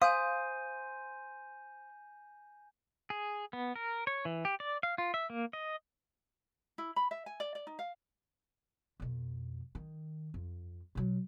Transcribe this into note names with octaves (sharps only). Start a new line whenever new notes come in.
C5 F5 G#5 D#6 G6 D#7
G#4
B3
A#4
C#5
E3
G4
D5
F5
F4
E5
A#3
D#5
E4
B5
E5
G#5
D5
D5
D#4
F5
F2 B2
D#3
F2
B2 F#3